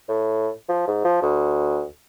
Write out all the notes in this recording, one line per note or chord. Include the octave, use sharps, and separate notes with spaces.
A2
F3
G#2
F3
D2